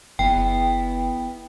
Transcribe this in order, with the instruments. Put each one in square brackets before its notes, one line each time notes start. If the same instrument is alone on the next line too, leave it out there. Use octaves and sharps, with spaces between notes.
[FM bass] F#1 [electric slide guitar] B3 E4 [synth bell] G5